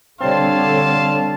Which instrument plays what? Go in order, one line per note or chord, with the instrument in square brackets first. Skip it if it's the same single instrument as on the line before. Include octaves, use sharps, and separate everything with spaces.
[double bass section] D3 [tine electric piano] G3 C4 [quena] C#5 [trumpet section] F5 A5 C6